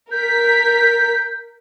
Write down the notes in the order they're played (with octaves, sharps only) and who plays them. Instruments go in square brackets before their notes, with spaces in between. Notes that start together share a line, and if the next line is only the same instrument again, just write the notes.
[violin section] A#4 B6 [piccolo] G6